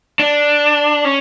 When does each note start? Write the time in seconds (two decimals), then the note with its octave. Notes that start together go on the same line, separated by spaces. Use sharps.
0.19 D4
1.05 C#4